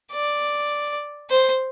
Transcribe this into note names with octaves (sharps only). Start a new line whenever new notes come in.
D5
C5